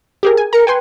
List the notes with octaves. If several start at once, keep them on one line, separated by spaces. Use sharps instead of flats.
G4 G#4 A#4
G#5
A#4 A#5 C#7
B4 G5 G#5 C6